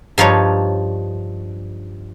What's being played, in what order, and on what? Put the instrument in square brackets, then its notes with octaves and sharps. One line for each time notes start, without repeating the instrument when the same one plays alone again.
[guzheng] G2 F3 D#4 C#5